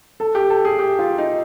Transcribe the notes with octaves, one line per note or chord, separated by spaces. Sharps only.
A4
G4
A4
G#4
G4
F4
D#4